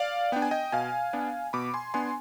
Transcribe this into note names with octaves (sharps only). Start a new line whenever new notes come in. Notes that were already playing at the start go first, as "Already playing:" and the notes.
Already playing: D5 F5
B3 D4 G5
G#5
D#5 G5
B2 F5 G#5
B3 D4
B2 B5 D6
G#5 C6
B3 D4 G#5 C6